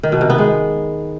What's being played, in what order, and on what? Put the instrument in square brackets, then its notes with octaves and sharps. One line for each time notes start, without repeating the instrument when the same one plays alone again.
[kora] D#3
B2
C3
B3
G#3